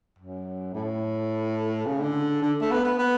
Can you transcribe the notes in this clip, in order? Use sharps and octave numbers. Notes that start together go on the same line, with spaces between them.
F#2
A2
C#3
D3
D3
A3
B3
B3
B3